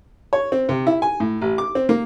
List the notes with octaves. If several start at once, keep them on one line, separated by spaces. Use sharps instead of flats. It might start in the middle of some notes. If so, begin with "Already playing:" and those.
C#5
C4
C3
E4
G#5
A2
A1
D6
C4
A#3